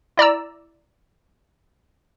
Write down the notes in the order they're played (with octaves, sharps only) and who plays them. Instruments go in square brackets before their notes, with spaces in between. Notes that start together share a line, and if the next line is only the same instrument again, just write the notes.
[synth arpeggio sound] E4 D5 A#5 E6